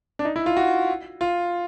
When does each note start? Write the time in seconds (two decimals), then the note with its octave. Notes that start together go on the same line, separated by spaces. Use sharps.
0.19 D4
0.25 D#4
0.36 E4
0.46 F4
0.56 F#4
1.21 F4